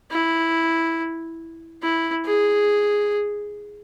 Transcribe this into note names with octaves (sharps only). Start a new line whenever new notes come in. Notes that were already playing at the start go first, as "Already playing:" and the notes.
E4
E4
G#4